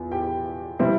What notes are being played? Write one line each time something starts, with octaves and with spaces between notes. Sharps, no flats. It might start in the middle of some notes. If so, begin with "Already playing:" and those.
Already playing: E2 F4
G4 G5
C3 G3 C4 E4